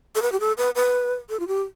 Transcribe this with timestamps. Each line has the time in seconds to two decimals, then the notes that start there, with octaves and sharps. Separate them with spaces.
0.15 A4
0.22 B4
0.32 G4
0.40 A4
0.58 B4
0.75 B4
1.29 A4
1.40 F4
1.48 G4